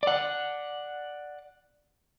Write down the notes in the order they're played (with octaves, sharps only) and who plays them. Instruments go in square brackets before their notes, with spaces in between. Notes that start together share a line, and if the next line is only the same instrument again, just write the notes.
[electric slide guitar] D5 F#5